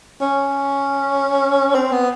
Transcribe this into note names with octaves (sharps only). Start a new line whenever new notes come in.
C#4
C4
B3